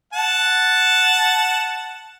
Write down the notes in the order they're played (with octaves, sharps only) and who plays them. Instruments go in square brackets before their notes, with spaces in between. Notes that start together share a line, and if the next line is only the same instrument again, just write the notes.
[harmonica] F#5 A5